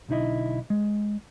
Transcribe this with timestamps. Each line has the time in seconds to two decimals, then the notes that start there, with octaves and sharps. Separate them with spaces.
0.09 B1 D3 D#4 E4 D#5
0.70 G#3